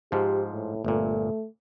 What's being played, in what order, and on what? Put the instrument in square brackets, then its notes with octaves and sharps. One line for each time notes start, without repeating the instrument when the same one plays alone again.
[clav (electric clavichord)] G#2 F3 [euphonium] G4
[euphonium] A2
[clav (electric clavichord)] G1 A#2 [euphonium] A3